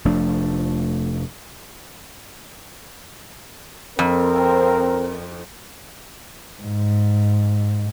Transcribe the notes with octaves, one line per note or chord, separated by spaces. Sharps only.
F1 F3 A3 D4
F2 C4 A#4
G#2